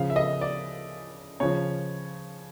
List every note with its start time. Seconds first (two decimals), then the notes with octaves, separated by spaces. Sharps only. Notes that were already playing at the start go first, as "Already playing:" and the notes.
Already playing: C#3 F3 F5
0.10 E5
0.16 D#5
0.41 D5
1.40 C#3 F3 C#5